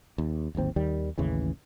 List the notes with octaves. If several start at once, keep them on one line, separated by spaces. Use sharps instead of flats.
D#2
D1 G#1 D#2 C4
D#2 D#3 G3
A1 D#2 C#3 E3